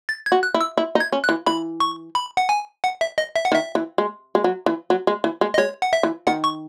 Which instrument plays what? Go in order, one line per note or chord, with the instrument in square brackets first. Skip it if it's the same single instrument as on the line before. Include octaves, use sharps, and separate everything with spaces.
[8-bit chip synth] A6
G#6
[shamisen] F#4
[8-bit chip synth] F#6
[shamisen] E4
[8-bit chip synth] E6
[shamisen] E4
D#4
[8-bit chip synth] G#6
[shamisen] C#4
[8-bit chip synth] F#6
[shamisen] E3
[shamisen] E3 [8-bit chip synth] B5
[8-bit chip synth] C#6
B5
F#5
G#5
F#5
E5
D#5
E5
F#5
[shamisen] D#3
[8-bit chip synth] E5
[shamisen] E3
G#3
G#3
F#3
E3
F#3
G#3
E3
G#3
[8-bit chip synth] D#5
[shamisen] G#3 [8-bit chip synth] C#5
[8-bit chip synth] F#5
E5
[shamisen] E3
[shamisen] D#3 [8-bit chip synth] F#5
[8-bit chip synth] C#6